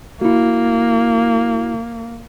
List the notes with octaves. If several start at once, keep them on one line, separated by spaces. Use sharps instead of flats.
A#3 E4 F#4